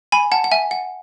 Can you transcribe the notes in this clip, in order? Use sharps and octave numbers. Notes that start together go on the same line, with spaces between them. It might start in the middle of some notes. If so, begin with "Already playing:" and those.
G#5 B5
F#5 A5
F#5
E5 G#5
F#5